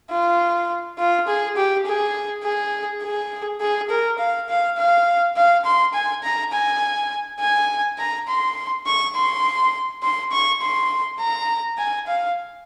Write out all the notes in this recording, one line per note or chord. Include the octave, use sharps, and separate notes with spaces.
F4
F4
G#4
G4
G#4
G#4
G#4
G#4
A#4
F5
F5
F5
F5
C6
G#5
A#5
G#5
G#5
A#5
C6
C#6
C6
C6
C#6
C6
A#5
G#5
F5